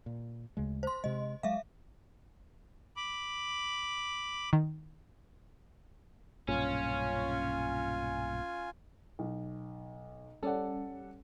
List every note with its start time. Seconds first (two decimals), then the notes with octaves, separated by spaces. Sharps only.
0.06 A#2
0.57 D2 C#3 G#3
0.83 C5 C6
1.04 C3 G#3 D#5
1.43 F#3 G#3 E5 F5
2.97 B5 D6
4.53 D#3
6.49 B1 G2 A#2 C#4 F4 G#5
9.19 B1
10.43 G3 C#4 A4 D5 F#5